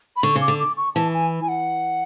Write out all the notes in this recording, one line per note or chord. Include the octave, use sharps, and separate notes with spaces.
B5
D3 C#6
C#3
D6
D3
D6
C#6
E3 A5
G#5
G#5
F#5